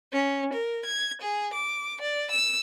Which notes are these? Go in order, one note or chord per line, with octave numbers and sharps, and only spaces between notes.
C#4
A#4
G#6
G#4
D6
D5
E6